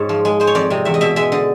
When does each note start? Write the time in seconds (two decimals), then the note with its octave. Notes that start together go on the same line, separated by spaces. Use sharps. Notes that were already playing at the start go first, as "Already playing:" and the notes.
Already playing: G#2 C#5
0.09 F3
0.25 G#3
0.40 G#3 C5
0.47 C#5
0.55 F2 D5
0.70 C3 D#5
0.85 E2 E5
0.94 D#5
1.01 B2 E5
1.16 G#3 E5
1.32 D3 D#5